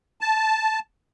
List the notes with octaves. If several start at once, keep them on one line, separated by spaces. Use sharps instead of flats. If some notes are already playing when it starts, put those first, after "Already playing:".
A5